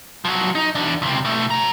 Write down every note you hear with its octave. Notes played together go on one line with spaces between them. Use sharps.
F3 F#3
D#4
E2 D4
C#2 C3
B2 A3
C#5 A#5